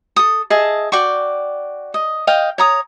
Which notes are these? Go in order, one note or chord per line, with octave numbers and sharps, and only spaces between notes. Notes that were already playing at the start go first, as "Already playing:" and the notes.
A4 D#6
G#4 D#5 E5 A5
F#4 D5 G5 C#6
D#5
D#5 F5 G5
C#5 A#5 D#6